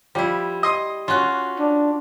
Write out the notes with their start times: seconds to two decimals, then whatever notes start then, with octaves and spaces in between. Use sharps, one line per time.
0.15 F3 G3 E4
0.63 D#5 C6 D#6
1.08 C#4 F4 F#4 F#6
1.59 D4